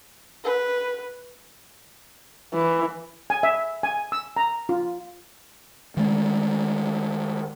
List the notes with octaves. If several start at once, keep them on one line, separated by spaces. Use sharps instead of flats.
B4
E3
G#5
E5
G#5
E6
A#5
F4
D#3 G#3 A3